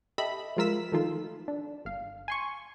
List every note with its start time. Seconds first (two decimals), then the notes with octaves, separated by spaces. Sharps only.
0.18 G4 A4 D#5 E5 B5
0.56 F3 G#3 F4 A#4 E6 B6
0.92 D#3 F3 A3 D#4 F4
1.48 D4
1.85 G1 F5
2.28 G#5 C6 C#6